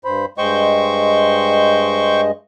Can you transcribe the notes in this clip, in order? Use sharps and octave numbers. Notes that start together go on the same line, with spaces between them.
G2 C5 B5
G2 G#3 C5 D#5 G5 C#6